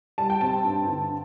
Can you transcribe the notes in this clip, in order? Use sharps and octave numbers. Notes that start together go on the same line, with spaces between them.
G3 A5
G5
C4 A5
G2
D3